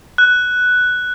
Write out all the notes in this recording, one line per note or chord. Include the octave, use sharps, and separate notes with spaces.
F#6